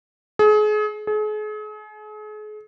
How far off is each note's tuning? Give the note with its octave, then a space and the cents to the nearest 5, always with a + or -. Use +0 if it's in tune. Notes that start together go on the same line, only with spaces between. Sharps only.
G#4 +35
G#4 +40